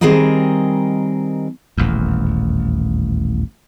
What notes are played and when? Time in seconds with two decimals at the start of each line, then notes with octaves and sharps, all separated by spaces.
0.01 D#3 G3 C4 G#4 A#4 D#5
1.78 D#1 A1 E2